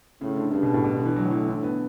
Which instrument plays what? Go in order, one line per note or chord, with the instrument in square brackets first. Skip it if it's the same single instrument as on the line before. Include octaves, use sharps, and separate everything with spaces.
[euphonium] A2 [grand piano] C#3
[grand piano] D3
[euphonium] G2 [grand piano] C#3
[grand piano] B2
A2
B2
D3
E3
[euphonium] A2 [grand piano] F#3
[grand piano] E3
D3
B3